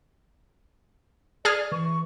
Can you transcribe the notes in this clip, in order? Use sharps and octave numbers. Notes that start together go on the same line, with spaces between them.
G#4 D5 F6 G#6
E3 C#6